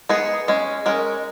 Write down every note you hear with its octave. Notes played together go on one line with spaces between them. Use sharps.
G#3 B3 D#4 G#4
G#3 C#4
G#3 C#4 A#4